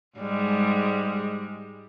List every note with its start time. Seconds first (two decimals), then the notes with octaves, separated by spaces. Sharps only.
0.18 G#2 G3 G#3